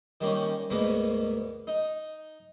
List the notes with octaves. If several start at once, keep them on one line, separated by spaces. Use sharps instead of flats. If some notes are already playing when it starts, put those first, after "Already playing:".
D#3 G3 A#3 C#4
D2 G#2 B2 A#3 B3
D#4